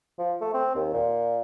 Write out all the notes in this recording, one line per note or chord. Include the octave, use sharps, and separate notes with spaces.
F3
A3
C4
D#2
A#2